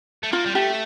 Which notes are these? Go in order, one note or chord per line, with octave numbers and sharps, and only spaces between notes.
A3
A#3 F4
G3
A3 G4